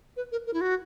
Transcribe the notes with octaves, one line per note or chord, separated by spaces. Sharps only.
B4
A#4
A#4
E4
F#4